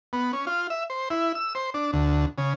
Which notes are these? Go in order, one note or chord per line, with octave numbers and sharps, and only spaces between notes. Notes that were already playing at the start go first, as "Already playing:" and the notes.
B3
C#4
F4
E5
C5
E4
E6
C5
D4
D2
C#3